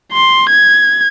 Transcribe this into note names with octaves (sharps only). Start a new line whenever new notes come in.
C6
G#6